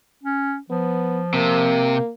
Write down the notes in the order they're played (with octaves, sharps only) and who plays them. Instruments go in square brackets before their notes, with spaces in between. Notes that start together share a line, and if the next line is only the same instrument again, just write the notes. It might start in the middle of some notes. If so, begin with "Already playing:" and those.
[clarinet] C#4
[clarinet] F3 [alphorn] B3
[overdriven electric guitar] C3 [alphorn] A#3